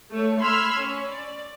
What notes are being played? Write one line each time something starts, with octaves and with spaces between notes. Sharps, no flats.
A3 C#5
B5 C6 E6 F6 G#6
C#4
D5